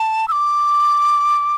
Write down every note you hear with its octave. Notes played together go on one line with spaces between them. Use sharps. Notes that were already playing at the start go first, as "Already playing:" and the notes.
Already playing: A5
E6
D6